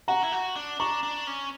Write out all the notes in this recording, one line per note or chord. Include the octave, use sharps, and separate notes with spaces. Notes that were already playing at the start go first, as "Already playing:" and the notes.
F#4 F#5 A#5
E4
F#4
D4
D4 A#5 C#6
D4
C#4